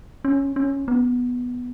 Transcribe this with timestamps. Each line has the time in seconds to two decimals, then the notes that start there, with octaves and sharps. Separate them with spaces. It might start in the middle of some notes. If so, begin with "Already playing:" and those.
0.25 C#4
0.56 C#4
0.88 B3